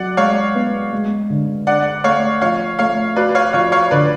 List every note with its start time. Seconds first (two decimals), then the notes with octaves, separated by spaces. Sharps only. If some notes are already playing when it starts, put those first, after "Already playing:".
Already playing: F#3 D5 F#5
0.17 G#3 C#5 F5
0.55 B3
0.92 G#3
1.30 D3
1.67 D4 D5 F#5
2.04 A3 C#5 F5
2.41 F3 C#5 F5
2.79 A3 C#5 F5
3.16 F#4 B4 D5
3.35 C#5 F5
3.53 F3 C#5 F5
3.72 C#5 F5
3.91 D3 B4 D5